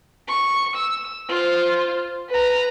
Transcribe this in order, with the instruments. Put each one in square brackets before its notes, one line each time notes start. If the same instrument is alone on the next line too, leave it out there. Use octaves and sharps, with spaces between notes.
[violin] C#6
E6
F4 C5
B4 A#5